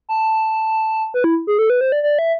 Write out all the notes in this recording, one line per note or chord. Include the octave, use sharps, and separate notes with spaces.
A5
B4
E4
G#4
A4
B4
C5
D5
D5
E5